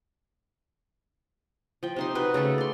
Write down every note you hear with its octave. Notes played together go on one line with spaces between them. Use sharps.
F3 G5
C3 D#4 C6
F#4 B4 G5
C#3 A3 A4
D5 C6